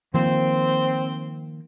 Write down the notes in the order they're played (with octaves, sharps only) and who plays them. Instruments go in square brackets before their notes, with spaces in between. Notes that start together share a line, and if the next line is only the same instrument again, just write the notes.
[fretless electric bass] D#3 F3 A#3 [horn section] C4